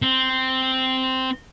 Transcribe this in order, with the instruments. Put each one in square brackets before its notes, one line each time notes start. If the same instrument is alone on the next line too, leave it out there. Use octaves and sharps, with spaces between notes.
[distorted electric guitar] C4